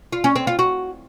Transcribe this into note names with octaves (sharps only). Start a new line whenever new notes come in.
F4
C#4
C4
F4
F#4